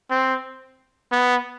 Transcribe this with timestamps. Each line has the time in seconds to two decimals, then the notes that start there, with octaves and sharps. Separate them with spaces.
0.11 C4
1.12 B3